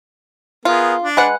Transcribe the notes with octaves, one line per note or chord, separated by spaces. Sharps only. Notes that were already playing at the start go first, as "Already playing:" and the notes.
B3 F4 G#4 A#4
D4
G#3 B4 F#5